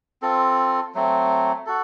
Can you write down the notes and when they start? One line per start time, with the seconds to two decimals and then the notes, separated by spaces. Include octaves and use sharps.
0.22 C4 F4 A4
0.95 F#3 A3 C4
1.66 F#4 A4